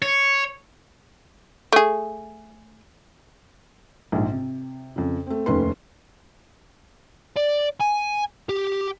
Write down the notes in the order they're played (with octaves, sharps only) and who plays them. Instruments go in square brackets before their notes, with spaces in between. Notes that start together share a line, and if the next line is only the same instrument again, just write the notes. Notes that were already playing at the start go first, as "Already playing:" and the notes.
[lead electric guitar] C#5
[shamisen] A3 G#4
[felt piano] A#1 G#2
C3
F2 C#3
A3 C4
F1 D#2 A3 C#4 B4 C6
[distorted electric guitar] D5
G#5
G4